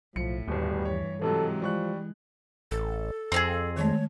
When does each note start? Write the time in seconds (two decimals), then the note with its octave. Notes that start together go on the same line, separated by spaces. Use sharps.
0.16 B1 A2 F3 C#7
0.48 D1 G1 D#2 G3
0.85 G2 E3 C#5
1.22 G#2 C3 E3 F#3 G#3 A4
1.62 F3 G3 C#6 F#6
2.71 A1 A4
3.32 F2 C4 D#4 G#4
3.76 D#3 G#3 A3 C#5